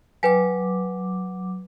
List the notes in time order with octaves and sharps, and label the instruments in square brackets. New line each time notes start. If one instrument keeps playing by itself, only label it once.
[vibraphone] F#3 D6 [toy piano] B4 G5 G#5